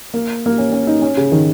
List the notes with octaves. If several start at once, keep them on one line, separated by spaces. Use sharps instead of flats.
A#3
A#3
C#4
C#4
D#4
C#4
C#3
D#3